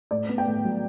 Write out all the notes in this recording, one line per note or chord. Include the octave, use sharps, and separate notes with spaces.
A2 D5
B3
G5
A2
F#3